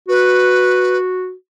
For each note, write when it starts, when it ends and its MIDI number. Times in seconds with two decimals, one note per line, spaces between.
0.08 1.33 66
0.08 0.97 71